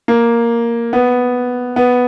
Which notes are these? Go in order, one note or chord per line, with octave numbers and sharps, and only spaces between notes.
A#3
B3
B3